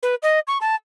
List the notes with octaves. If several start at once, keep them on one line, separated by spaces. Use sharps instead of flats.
B4
D#5
C#6
A5